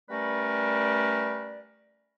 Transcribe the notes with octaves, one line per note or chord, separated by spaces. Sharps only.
G3 A3 C#4 A#4 B4 D5